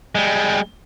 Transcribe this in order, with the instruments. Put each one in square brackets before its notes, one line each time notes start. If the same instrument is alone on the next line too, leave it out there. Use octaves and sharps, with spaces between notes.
[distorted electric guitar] G3 G#3